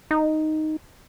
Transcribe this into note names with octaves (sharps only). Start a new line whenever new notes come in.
D#4